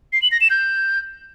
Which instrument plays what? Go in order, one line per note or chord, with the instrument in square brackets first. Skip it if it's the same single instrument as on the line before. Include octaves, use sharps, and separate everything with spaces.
[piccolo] C7
F#7
A#6
E7
G6